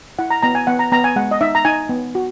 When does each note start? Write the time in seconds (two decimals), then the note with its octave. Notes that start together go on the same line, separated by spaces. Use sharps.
0.19 E4 F#5
0.30 A#5
0.43 B3 A#5
0.55 G#5
0.67 B3 F#5
0.79 A#5
0.92 B3 A#5
1.04 G#5
1.16 G#3 F#5
1.31 D#5
1.41 D#4 E5
1.55 A#5
1.65 D#4 G#5
1.89 B3
2.15 F#4